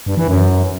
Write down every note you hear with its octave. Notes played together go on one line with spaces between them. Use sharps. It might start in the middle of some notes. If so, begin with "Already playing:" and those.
G2
E3
F#2